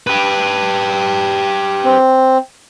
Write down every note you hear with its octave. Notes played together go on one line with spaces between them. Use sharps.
G4 B4
C4